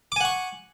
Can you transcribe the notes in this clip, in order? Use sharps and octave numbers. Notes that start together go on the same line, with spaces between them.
F#5 G#5 C#6 D6